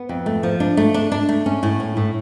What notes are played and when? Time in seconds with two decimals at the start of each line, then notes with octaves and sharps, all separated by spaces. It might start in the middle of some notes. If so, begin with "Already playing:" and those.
Already playing: B3
0.09 F2
0.26 A3
0.43 F3
0.60 D4
0.77 A3
0.94 D4
1.12 D4
1.29 A3
1.46 C#4
1.63 A2
1.80 C#4
1.97 A2